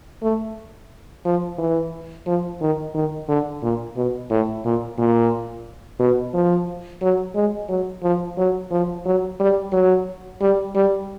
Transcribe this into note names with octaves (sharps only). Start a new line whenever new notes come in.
A3
F3
E3
F3
D#3
D#3
D3
A#2
B2
A2
A#2
A#2
B2
F3
F#3
G#3
F#3
F3
F#3
F3
F#3
G3
F#3
G3
G3